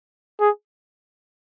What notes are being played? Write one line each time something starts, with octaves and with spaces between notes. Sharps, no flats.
G#4